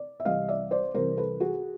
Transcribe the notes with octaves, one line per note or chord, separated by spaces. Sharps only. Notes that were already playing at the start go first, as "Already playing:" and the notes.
Already playing: D5
E5
C2 C3 E3 D#5 F5
D5 E5
C5 D5
C2 C3 E3 A#4 C5
A4 B4
F#4 G#4